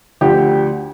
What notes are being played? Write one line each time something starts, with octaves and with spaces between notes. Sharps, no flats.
D2 D3 F3 G4